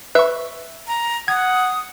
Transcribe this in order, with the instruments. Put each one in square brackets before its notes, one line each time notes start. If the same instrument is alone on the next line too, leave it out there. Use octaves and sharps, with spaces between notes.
[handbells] B4 C#6 [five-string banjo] E5
[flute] A#5
[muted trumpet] F#5 [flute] D#6 [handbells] G#6